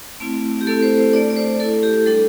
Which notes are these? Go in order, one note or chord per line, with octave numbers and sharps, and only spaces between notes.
A3 C4 E4
G4
A3 C4 E4 A4
C5
C5
A3 D4 D5
D5
C5
A3 E4 A4
G4
G3 D4 A4